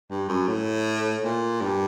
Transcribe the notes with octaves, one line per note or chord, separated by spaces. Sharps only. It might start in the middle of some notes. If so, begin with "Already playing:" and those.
G2
F#2
A2
A#2
G2